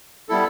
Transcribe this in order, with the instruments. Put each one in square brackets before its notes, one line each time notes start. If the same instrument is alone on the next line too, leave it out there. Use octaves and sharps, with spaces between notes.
[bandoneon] G3 B3 E4 A4